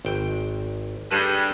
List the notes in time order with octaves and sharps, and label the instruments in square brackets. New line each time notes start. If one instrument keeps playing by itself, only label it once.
[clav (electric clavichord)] G#1 G5
[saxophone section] G2 [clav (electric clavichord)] G#4 A4 B4